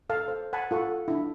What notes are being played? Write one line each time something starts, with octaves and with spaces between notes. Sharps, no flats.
A4 F5 A5
C5
F#5 G#5 A5 B5
F4 A4 F#5 C#6
D4 E4